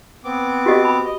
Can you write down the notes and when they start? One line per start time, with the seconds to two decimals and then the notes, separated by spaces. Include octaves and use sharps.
0.24 B3 C4 D6
0.66 F#4 G4 D#5
0.84 B5
1.04 D#5